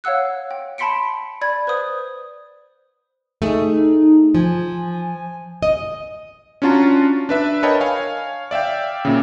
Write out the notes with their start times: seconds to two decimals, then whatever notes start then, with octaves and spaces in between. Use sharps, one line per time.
0.04 C#5 F5 F#5 E6 F#6
0.51 G5
0.78 A5 B5 C6 B6 C#7 D7
1.41 D5 B5 G#6
1.67 B4 C5 D#6
3.42 A3 D#4 G#4
4.35 F3 G#5
5.63 D#5
6.62 C#4 D4 F4 F#4 A5 A#5
7.29 D4 B4 E5
7.63 A#4 C#5 D#5 G5 A5 B5
7.81 C#5 F5 G#5
8.51 D5 E5 F5 G5
9.05 A#2 C#3